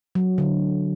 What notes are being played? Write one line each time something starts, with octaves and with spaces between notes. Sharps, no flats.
F#3
D3